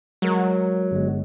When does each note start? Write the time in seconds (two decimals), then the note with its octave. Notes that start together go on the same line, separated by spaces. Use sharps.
0.22 F#3 G#3 A#4
0.91 G1 G#3